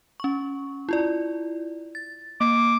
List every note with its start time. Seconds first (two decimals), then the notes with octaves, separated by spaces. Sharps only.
0.20 C#4 C#6
0.89 E4 F4 D5
1.95 A6
2.41 A#3 D6